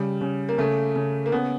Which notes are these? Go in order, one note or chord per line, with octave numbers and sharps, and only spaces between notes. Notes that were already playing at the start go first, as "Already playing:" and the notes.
Already playing: C#3 G3
C#3
A#3
C#3 A3
C#3
A#3
C#3 B3